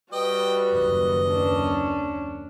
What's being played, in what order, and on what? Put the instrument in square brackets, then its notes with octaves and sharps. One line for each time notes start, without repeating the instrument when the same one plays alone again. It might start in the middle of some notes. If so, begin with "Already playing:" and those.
[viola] G3 F#4 [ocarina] B4 [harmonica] D#5 G5
[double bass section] F#1 D#2 [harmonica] D#5
[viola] C#4 D4